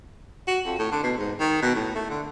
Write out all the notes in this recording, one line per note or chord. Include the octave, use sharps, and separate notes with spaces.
F#4
F2
A2
D3
B2
G#2
D#3
B2
A2
A3
D3